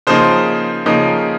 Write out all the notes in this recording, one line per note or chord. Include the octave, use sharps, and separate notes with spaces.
C#3 F3 A#3 D#4 C5
C#3 F3 A#3 D#4